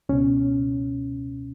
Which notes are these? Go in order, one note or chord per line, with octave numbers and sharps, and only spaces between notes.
C#2 B2 C#4